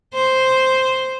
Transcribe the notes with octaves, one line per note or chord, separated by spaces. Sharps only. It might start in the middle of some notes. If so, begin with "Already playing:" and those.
C5